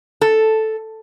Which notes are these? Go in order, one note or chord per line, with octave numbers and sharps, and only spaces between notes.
A4